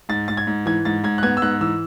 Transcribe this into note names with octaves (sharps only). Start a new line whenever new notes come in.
G#2 A6
G#2 A6
G#6
G#2
E3 G#6
G#2 A6
G#2 G#6
F#6
B3 G#6
E6
G#2 F#6
E3 E6